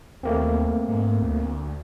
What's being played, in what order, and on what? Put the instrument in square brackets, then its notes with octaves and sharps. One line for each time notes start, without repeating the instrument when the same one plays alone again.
[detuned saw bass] D#2 [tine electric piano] A3 A#3 C4
[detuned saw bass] G#2
D2